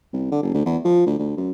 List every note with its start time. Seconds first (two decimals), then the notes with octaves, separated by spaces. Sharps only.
0.13 C2
0.31 D3
0.43 F#1
0.54 D2
0.66 E2
0.85 F3
1.06 D2
1.19 D2
1.37 F#2